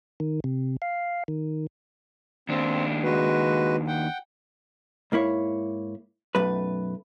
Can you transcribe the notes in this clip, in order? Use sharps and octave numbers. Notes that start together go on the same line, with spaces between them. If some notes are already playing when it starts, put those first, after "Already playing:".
D#3
C3
F5
D#3
D#2 C4 D4
G#3 F#4 B4
F#5 G5
G#2 A#3 E4 C#5
B1 F#2 A3 B4